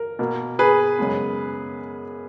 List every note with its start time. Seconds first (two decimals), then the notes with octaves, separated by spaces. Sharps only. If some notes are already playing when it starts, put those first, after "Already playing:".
Already playing: A#4
0.19 B2 A#3
0.59 G#4 B4
0.99 F#2 C#3 G#3 B3